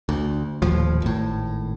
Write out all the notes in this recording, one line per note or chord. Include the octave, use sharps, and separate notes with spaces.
D2
D#1 D#2 A2 F3
G#1 A2